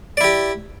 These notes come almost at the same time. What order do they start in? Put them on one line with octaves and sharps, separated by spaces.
D5 E4 G4